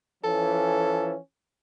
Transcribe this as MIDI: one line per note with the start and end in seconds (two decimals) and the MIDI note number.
0.24 1.16 52
0.24 1.16 53
0.24 1.16 61
0.24 1.14 69